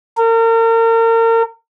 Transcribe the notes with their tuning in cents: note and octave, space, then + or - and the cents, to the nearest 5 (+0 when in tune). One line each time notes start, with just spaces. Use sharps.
A#4 -35